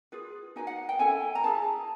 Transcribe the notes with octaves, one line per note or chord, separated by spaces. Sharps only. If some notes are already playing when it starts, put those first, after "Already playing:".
F4 G#4 B4
D#4 F#4 B4 G#5
F#5
G5
C#4 E4 A4 G#5
A#5
E4 G#4 B4 A5